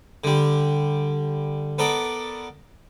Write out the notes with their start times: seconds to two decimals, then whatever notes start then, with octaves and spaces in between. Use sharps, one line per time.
0.24 D3 G3
1.78 B3 A4 A#4 D5